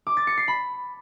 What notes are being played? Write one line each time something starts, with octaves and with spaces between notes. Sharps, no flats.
D6
A6
C#7
C7
B5